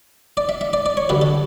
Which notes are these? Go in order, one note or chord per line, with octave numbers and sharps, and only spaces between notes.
D5
E5
E5
D5
D5
C#5
F#2 D3 G3 B4
A4